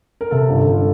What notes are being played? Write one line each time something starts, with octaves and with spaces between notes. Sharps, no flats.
A#4
C3 A4
G1
G1